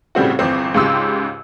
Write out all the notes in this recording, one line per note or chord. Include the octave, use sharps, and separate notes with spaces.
A2 C#3 G3 C4 F#4
G1 E2 C4
C#2 G#2 C#3 G4 C6 E6